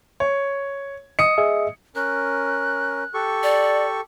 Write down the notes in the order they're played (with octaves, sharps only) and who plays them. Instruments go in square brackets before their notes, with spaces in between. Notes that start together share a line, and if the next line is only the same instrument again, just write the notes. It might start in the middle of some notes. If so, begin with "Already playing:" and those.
[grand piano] C#5
[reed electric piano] D#5 [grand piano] D#6 C#7
[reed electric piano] G#4 D#5 E5
[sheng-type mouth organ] C#4 A#4 [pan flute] F#6
[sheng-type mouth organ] G4 A4 C#6
[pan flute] D5